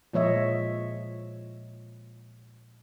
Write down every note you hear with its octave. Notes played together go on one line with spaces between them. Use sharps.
A#2 F3 G#3 C#5 D#5 E5